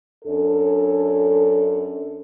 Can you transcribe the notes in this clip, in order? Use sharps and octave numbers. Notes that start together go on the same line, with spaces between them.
F#2 C#4 D4 A4